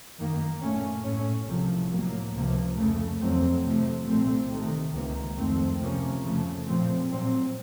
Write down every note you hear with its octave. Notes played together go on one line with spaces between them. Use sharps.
F#2 D#3 A#3
A#2 A3 C#4
A2 A3 C#4
C2 C3 F3
A2 F#3 A#3
C#2 C3 F3 A#3
F2 C#3 A3
F2 D#3 F#3 A3 C4
C3 F3 A3
C2 A#2 A3 C4
C3 D#3 A3
C#2 C3 D#3 A#3
F2 D#3 A3 C4
C3 F3 A#3 C#4
F2 C#3 F3 A3
A#2 F3 A3 C4
A#2 F#3 C4